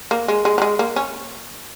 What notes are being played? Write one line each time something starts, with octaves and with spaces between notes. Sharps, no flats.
A#3
G#3
G#3
F#3
G#3
A#3
C#4